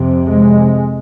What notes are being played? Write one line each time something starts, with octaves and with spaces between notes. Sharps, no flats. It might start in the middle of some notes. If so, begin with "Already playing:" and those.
Already playing: F2 C3
G#3